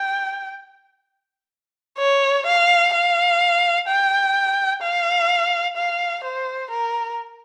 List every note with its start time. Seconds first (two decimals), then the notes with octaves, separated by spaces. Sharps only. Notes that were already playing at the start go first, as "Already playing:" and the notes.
Already playing: G5
1.98 C#5
2.46 F5
2.94 F5
3.88 G5
4.82 F5
5.77 F5
6.24 C5
6.71 A#4